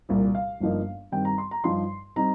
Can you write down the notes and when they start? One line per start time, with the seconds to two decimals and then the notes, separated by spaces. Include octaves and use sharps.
0.09 C2 A#2 G3
0.35 F5
0.60 G1 G2 F3 A#3 D#4
1.12 G2 D#3 G3 C4 G5
1.25 A#5
1.38 C6
1.51 A#5
1.64 G2 F3 D#4 C6
2.16 G3 C4 D#4 A#5